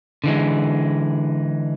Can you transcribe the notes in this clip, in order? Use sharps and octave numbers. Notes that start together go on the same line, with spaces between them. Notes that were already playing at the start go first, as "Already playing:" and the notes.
D3 E3 G#3